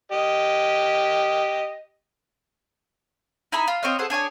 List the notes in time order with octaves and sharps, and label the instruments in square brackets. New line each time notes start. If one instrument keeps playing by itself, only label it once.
[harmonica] G4 D#5
[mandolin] D#4 E4 G#5 B5
F4
C4 C#5 D#5 F5
G#4 A4 C5 F#5
D4 G#4 C#5 G#5